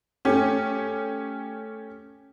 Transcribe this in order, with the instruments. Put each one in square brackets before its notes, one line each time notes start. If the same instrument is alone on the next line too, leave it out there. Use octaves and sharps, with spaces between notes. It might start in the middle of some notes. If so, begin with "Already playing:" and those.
[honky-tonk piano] A3 C#4 G4